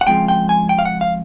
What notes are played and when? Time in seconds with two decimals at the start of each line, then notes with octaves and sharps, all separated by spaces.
0.01 F#5
0.07 C#3 F3 G#3 C4 F4 G5
0.28 G5
0.49 G#5
0.69 G5
0.79 F5
0.85 F#5
1.01 F5